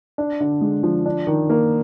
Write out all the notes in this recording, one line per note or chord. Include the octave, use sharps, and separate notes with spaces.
D4
D3
G#3
F3
D4
D#3
A#3